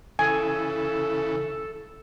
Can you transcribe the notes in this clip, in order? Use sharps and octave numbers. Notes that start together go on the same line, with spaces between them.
C#3 E3 A4 G#5